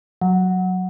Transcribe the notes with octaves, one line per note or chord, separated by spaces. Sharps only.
F#3